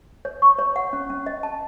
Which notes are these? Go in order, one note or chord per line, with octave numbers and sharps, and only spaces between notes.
C#5
C#6
C#5
F#5
C#4
C#4
D#5
A5